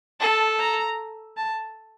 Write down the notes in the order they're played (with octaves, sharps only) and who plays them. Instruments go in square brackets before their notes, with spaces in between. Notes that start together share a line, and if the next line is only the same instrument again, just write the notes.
[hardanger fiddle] A4 [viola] A5
[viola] A#5
A5